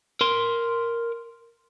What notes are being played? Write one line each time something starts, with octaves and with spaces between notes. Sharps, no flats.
A#4 C6